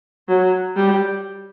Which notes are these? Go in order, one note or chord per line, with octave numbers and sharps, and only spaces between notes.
F#3
G3